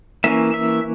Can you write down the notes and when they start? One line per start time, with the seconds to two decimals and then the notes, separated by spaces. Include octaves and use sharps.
0.24 E3 A#3 C#4 E5
0.54 E5